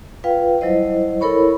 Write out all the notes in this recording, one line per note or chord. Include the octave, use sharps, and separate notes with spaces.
F4 B4 F5 G5
F#3 G3 E4 C5 D#5
E4 A4 A#4 C#5 B5 C#6